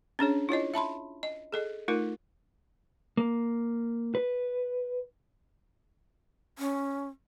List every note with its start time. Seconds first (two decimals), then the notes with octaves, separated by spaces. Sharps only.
0.19 C#4 D4 G#4 C#5
0.49 E4 F4 C#5 D#5
0.74 E5 A5 B5 C6
1.23 D#5
1.52 G#4 A4 D#5
1.88 A3 D#4 F4 A#4
3.17 A#3
4.15 B4
6.59 C#4